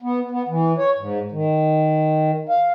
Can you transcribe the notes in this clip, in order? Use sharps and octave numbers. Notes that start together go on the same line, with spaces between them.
B3
B3
E3
C#5
G#2
D#3
F5